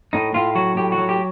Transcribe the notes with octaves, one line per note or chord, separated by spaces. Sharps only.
A2 D#4
A2 F4
F#3 F#4
A2 G4
F#4
F#3
G4